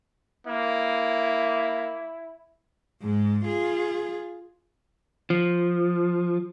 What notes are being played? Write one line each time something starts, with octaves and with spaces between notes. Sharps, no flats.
A#3 E4
G#2 G#3
F4 G#4
F3